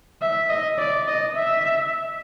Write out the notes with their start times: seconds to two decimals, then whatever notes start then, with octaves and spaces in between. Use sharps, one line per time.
0.21 E5
0.49 D#5
0.78 D5
1.07 D#5
1.36 E5